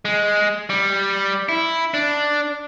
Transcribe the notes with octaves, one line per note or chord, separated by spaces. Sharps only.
G#3
G3
E4
D4